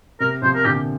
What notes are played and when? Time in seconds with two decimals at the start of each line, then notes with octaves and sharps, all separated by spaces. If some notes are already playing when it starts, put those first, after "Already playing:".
0.20 C3 A#4
0.42 C3 F3 C5
0.55 A#4
0.65 A#2 D3 G4